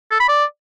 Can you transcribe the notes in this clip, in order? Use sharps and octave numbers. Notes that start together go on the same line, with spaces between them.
A4
B5
D5